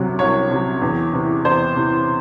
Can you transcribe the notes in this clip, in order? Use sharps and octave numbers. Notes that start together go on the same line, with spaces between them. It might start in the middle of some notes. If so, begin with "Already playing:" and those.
Already playing: C2 C3 F#3
C2 C#5
C3 F#3
E2
C3 E3
E2 C5
C3 E3